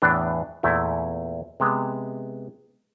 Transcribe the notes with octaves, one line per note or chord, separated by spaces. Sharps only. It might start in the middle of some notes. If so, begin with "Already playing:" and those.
E2 A2 E3 B3 D4
E2 A#2 A3 E4
C3 G#3 B3